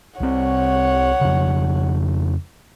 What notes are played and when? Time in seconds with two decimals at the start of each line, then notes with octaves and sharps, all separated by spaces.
0.20 C2 C4 C#5 F#5
1.21 F2 C#3